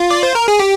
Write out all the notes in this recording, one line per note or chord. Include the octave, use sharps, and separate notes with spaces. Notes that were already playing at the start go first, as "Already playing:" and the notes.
Already playing: F4
D5
C5
A#4
G#4
G4